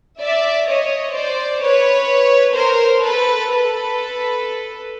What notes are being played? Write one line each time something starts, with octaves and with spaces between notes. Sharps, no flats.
D5 E5
C#5 D#5
C5 D5
B4 C#5
A#4 C5
A4 B4
A4 B4